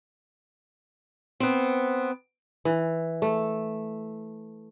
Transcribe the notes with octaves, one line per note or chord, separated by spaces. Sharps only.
B3 C4
E3
A3